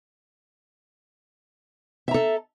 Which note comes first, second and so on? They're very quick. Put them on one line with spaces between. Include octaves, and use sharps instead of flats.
E5 A#5 A4